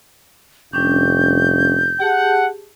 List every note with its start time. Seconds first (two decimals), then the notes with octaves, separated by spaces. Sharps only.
0.73 F1 G3 C#4 D4 G6
2.00 G4 G#4 F#5 A5